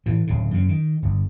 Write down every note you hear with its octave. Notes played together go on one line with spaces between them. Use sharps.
A2 E3
D1 C#3
F#2 C#3
D#3
G1